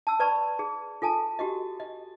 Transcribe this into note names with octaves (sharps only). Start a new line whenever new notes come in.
A5 E6
B4 D5 A5 B5 C#6
G#4
F4 A4 G#5 A5
F#4 G4 D#5
D#5